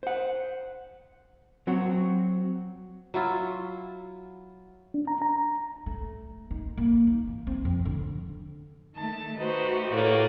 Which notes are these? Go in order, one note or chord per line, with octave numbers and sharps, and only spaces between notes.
C5 F#5
F#3 C4 F#4
F#3 E4 F4
D4
A#5
A#5
A3
D#4
A#3
D#4
E3
C4
F2
D3
D#3 A3 A5
A3 D#4 F#4 G4 B4 C5
A2 A#3 B4 D5